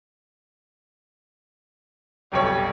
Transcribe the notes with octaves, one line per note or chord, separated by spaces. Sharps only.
F1 B1 G3 C#5